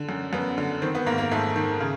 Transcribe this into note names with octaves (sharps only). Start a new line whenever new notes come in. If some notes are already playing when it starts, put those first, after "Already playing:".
Already playing: D3
F#2
F#2 B3
D3
D#3 C4
B3
G#2 A#3
A#3
G#2 A3
D#3
C#3